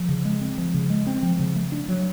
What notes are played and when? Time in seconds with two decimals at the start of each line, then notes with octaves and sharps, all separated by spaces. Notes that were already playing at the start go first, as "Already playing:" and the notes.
Already playing: F3
0.09 C#3
0.25 G#3
0.41 C4
0.58 F3
0.74 C#3
0.90 G#3
1.07 C4
1.23 F3
1.39 C#3
1.56 A3
1.72 D4
1.88 F#3